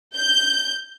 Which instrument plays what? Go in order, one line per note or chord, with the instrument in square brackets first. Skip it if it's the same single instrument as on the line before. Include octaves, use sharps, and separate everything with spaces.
[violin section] G6